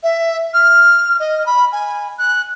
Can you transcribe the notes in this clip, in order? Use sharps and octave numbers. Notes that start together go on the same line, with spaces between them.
E5
F6
D#5
B5
G#5
F#6